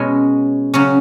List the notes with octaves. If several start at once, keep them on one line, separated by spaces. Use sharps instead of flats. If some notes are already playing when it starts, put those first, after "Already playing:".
Already playing: B2 G#3 C#4
C#3 F#3 C#4